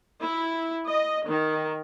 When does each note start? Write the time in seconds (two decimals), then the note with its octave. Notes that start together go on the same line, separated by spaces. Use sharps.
0.22 E4
0.87 D#5
1.27 D#3